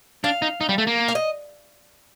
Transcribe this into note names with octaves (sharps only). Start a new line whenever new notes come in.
D4 F5
D#4
D#4
G3
A3
A#3
F5
D#5